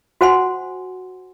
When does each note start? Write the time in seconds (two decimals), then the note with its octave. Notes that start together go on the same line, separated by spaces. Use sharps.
0.21 F#4 C5 F#5 G#5 C6